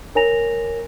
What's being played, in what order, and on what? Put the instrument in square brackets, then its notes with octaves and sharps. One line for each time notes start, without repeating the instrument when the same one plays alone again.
[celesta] A#4 C#5 G#5 A#5 A#6 F7